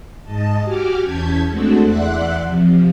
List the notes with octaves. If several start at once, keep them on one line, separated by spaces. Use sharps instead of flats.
G#2 D#5 A5
F#4 G4 G#5 D6 F6
E2 C#4 A5 G6 G#6 B6
G#3 A3 C4 D4 F#4 A4
E2 D5 E5 F#5 C6 F#6
C3 F3